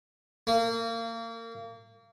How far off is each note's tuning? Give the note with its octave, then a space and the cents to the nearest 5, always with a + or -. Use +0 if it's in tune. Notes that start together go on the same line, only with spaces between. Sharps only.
A#3 -30